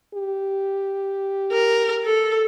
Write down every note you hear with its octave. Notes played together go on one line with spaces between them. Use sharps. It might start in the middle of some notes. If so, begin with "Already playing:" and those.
G4
A#4
A4